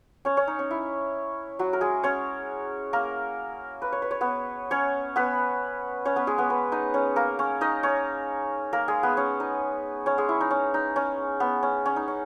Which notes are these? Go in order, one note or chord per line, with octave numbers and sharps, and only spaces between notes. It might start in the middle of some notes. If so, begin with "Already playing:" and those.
C#4 C#5
C#4 C#5
D#4
C#4
E4
F#3 F#4
A#4
G#3 G#4
C#4 C#5
A#3 A#4
B4
C#5
B4
C#5
B3 B4
C#4 C#5
B3 B4
C#4 C#5
B3 B4
G#3 G#4
B3 B4
B3 B4
D#4 D#5
C#4 C#5
A#3 A#4
C#4 C#5
D#4 D#5
C#4 C#5
A#3 A#4
G#3 G#4
B3 B4
C#4 C#5
D#4 D#5
C#4 C#5
G#3 G#4
E4
D#4
C#4
D#4
C#4
B3
C#4
C#4
D#4
C#4